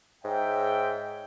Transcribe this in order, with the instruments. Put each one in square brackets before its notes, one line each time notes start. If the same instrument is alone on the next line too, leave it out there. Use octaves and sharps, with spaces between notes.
[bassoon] G#2 [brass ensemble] C#5 E5 G5